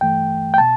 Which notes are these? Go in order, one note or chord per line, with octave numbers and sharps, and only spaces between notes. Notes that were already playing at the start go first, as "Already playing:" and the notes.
G2 E3 A3 G5
G5
B2 A5